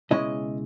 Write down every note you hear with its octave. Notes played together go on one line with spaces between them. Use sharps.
C#2 B2 G#3 C#4 E4 D#5